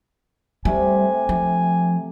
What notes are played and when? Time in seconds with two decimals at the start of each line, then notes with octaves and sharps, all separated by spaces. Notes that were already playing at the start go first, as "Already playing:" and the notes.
0.65 C3 G3 A3 G4 G#5
1.29 F3